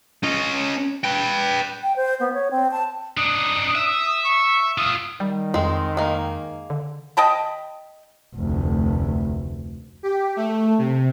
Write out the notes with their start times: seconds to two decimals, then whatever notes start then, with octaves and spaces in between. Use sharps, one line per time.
0.24 C#4 D#5
1.04 B4 G5
1.83 G5
1.96 C5
2.20 B3
2.33 C#5
2.51 C4
2.71 A5
3.17 D4 D#4 D#6
3.75 E5
4.24 C#6
4.78 F4 E5 D#6
5.20 D#3 G3
5.54 F2 G#3 C4
5.97 G#3 A#3
6.70 D3
7.17 D#5 G5 A5 B5
8.35 F1 D2
10.03 G4
10.36 A3
10.78 C3